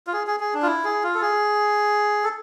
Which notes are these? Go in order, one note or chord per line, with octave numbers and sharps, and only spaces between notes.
F4
G#4
G#4
G#4
D4
F4
E4
G#4
F4
A4
G#4
A4